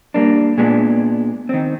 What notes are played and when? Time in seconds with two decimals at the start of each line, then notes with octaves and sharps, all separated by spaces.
0.14 G3 A#3 D4
0.58 A#2 G#3 B3 D4
1.49 D#3 C4